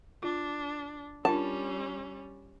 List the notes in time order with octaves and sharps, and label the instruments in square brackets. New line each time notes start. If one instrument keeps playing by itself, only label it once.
[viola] D4 [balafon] F4
[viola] G3 C#4 [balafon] D4 F4 A#4 [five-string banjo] A5